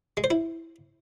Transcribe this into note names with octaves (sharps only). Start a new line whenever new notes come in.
G#3
C5
E4